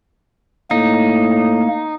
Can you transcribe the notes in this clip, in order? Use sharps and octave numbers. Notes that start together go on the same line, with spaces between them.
A2 A#3 D#4